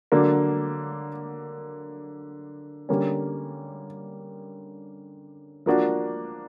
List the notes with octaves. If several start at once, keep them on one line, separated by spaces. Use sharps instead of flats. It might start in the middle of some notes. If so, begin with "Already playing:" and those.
D3 F#3 A#3 D4
D3 G3 A#3 C#4
F3 A#3 D4 F#4